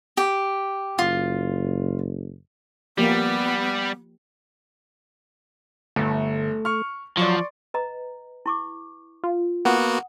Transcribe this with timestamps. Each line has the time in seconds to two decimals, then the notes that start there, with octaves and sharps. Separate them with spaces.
0.17 G4
0.99 F#1 F4
2.98 F3 G3 A#3 B3 G4
5.96 G1 A3
6.65 C#6 F6
7.17 F3 F#3 D5 C6 C#6
7.74 B4 D#5 A#5
8.46 E4 C#6 D6
9.23 F4
9.65 A#3 B3 F#4 F#5 D#6